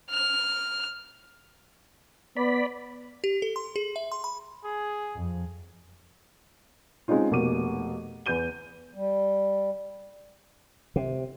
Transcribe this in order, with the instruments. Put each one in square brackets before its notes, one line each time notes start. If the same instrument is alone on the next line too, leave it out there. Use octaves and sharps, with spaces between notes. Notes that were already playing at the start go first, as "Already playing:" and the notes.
[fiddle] F6
[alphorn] B3 [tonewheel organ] D5 B5
[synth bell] G4
A4
C6
G#4
E5
C6
B5
[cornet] G#4
[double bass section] F2
[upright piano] G#3 C4 C#4 D#4 F4
F1 B2 A#3 D6 D#7
E2 B4 G6 D#7 G7
[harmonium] G3
[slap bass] C3